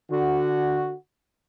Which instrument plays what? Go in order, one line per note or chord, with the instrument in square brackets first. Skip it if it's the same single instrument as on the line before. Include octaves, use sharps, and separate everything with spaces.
[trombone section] D3 F#4